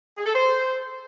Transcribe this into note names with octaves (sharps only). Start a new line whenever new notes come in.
G#4
A4
C5